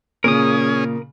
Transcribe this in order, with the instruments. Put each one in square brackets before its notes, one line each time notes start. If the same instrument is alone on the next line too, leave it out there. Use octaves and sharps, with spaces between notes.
[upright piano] A#2 C#3 [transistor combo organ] C#4 G#4 [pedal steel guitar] A#4 D#6